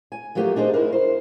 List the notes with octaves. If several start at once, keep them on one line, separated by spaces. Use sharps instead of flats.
G#5
F3 F#3 A3 A#3 G4
D4 D#4 G#4 C5
E4 A#4
C5